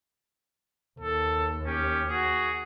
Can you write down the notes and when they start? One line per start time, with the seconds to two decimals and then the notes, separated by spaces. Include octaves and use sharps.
1.00 D#2 A4
1.66 C#4 G4
2.08 F#4 G#4